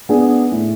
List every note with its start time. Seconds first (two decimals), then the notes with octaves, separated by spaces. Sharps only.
0.09 B3 D4 G#4
0.52 A2